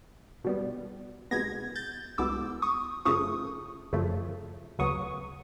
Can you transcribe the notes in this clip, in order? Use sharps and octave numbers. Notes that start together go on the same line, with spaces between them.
B2 G3 B3
C2 B2 G#3 B3 G#6 A#6
G6 A6
C2 B2 G#3 B3 D6 E6
C#6 D#6
F#2 C#3 F3 A3 C#6 D#6
F#2 C#3 F3 A3
D2 C#3 F#3 B3 C#6 D#6